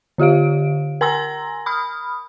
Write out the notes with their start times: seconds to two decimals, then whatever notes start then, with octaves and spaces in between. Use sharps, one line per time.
0.18 D3 F4 G4 F5 D7
1.01 A#4 G#5 A#5 C6 E6 A#6
1.66 B5 D#6 F6